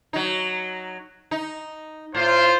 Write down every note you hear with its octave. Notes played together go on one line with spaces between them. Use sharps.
F#3 D#4
D#4
A2 F4 C5